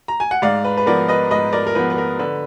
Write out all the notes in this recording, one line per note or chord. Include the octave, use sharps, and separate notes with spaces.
A#5
G#5
F#5
G#2 D5 F5
B4
B4
F3 B3 A#4 D5
B4 D#5
G#2 B4 D#5
A#4 D5
A#4
F3 B3 B4
B4
A#4
D3 B4